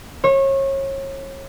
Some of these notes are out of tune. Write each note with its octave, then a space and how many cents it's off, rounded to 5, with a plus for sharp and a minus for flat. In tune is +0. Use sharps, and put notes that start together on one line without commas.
C#5 -30